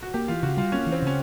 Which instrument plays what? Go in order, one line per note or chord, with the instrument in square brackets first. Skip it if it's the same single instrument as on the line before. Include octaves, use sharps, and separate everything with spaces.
[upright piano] F#4
[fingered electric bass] A#3 [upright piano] G4
[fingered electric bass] E3 [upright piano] F4
[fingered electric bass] C#3 [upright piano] F#4
[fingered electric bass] G3 [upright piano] F4
[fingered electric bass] A#3 [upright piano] C#4
[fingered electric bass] E3
[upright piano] C4
[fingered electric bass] C#3 [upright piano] C#4